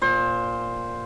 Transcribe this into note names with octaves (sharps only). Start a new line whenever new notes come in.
A#2 C5